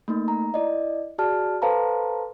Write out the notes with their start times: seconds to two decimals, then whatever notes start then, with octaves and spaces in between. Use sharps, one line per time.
0.08 A3 A#3 D#4
0.28 A#5
0.54 E4 D5 D#5
1.18 F#4 G#4 D5 A5 F6
1.62 A4 B4 C5 F5 A5 A#5